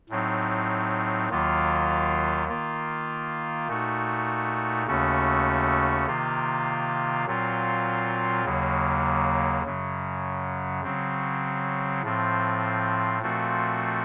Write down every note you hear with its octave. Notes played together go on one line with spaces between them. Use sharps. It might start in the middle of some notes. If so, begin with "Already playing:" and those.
A2 F#3 C4 D#4
D#2 D#3 F#3 A#3 F4
D#3 A#3 F4
A#2 A3 D#4 F#4
D#2 C#3 A3 C#4 F#4
C3 D#3 A#3 F4
A#2 F#3 C4 F4
D#2 C#3 F#3 A#3
F#2 C#3 F#3
C#3 F#3 C4
A2 F3 C4
A#2 F3 A3 C4 F#4